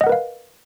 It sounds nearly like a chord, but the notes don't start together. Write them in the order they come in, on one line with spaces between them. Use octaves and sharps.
D#5 F#5 A#4 B4 F5